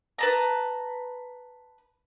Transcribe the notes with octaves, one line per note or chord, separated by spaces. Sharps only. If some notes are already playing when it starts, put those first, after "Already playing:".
B4 A5 A#5